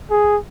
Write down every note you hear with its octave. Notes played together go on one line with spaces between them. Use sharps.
G#4